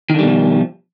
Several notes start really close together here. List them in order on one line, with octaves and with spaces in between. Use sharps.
D#3 D3 G3 B2 F3